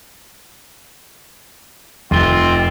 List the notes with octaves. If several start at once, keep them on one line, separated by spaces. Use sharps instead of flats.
F1 C4 F4 G7